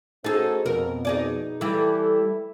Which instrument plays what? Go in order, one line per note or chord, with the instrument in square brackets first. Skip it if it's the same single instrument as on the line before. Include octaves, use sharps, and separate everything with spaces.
[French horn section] C#4 F#4 C5 [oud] D#4 G#4 [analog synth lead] A4
[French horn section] F2 [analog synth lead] B2 [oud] A#4
[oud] D#4 G#4 D5
[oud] E3 G3 [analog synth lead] E4 [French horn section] A4